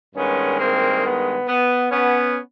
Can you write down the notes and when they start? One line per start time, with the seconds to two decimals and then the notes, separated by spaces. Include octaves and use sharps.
0.15 G2 D#3 G#3 B3 C#4
0.58 A#3 C4
1.02 B3
1.47 B3
1.91 B3 C#4